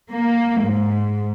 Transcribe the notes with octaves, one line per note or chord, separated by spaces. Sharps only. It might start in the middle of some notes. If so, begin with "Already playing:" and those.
A#3
G#2